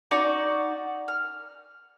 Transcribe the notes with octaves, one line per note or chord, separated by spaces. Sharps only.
D#4 F#4 D5 C#6
F6